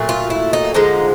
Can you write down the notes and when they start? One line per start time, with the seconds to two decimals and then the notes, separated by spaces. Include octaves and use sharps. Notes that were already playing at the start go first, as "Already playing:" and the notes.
Already playing: A#2 F#3 A3
0.09 F4
0.30 E4
0.53 D#4
0.74 D3 F3 G#3 D#4